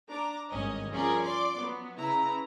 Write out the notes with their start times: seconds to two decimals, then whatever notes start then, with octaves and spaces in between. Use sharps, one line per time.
0.10 D4 A#5 D6
0.49 G#1 G2 C#4 D#5
0.91 F3 C#4 G#4 A#4 D5
1.23 D5 C6 D6
1.56 F#3 B3
1.98 C#3 E4 B4 A#5